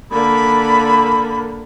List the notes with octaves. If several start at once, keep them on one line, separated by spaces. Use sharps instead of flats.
D3 A#3 B5